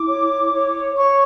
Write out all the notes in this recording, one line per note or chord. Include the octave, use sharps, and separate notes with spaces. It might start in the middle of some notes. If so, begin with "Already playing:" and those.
Already playing: E4 D6
C#5
C#5
C#5 C#6